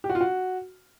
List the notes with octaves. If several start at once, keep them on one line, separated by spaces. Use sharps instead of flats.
G4
F#4
F4
F#4